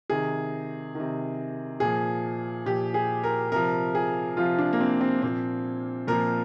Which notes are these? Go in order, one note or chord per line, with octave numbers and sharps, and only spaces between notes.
C3 D#3 G#4
C3 D#3
A#2 F3 G#4
A#2 F3 G4
G#4
A#4
C3 F3 A#4
G#4
C3 F3 F4
D4
A#3
C4
C4
A#2 F3 C4
A#2 F3 A#4